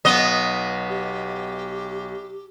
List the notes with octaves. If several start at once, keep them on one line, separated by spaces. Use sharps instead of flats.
B1 B3 D#5
G4